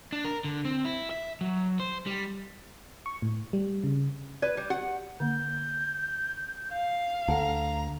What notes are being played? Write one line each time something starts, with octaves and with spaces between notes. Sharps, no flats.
D4
A#4
D3
C4
E4
E5
F#3
C5
G3
C#6
A2
G3
C#3
B4 D5
G3
G4 F#5
D3 A#3 G6
F5
D2 A4 F#5 A5 A#5